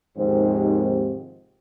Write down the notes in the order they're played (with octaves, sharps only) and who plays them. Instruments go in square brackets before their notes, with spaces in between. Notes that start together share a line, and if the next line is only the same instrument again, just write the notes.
[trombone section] D#2 G#2 C3 D#3 F3 C4